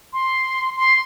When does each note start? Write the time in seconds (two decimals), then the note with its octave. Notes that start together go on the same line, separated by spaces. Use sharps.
0.13 C6
0.77 C6